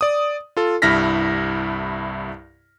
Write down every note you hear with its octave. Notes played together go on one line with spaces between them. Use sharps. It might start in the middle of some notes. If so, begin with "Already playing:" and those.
D5 D#6
F4 A4
C2 G2 E4 F6 A#6 B6